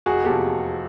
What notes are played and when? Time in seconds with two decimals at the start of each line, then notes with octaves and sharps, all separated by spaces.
0.06 F1 F#4 G#4
0.24 E2 C3 F3 G4 A4